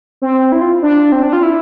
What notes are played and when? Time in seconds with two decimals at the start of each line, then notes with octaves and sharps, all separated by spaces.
0.22 C4
0.52 E4
0.61 F4
0.82 D4
1.12 C4
1.23 D4
1.33 F4
1.43 E4